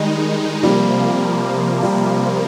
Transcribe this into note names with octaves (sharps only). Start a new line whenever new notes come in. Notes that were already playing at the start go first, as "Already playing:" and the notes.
Already playing: D#3 G3 G#3 D#4
C3 F3 G3 A#3
C3 F3 G3 A#3